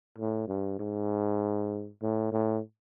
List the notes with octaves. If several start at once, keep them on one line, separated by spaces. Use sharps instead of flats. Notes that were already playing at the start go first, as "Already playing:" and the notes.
A2
G2
G#2
A2
A2